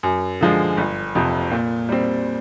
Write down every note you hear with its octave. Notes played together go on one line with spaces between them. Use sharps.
F#2
D3 F3 G#3
G1
F2 C3
A#2
G3 C4